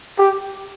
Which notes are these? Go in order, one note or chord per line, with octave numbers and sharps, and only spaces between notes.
G4